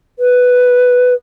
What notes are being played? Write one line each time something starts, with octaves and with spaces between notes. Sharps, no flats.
B4